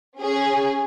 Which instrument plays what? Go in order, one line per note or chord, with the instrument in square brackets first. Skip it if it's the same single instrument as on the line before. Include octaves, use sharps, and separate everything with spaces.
[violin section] C#4 G#4